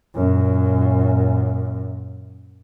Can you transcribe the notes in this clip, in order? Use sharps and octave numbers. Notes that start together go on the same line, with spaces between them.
F#2 A#2